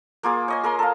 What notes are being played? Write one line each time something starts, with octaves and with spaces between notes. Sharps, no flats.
A#3 F4 G#4 D#6
C#5 D#5 G#5
G#4 A#4 A#5 C6
A4 F5